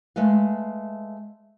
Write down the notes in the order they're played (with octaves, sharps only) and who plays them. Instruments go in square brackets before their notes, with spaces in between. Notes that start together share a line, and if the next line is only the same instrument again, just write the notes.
[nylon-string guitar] G#3 A3 B4 F5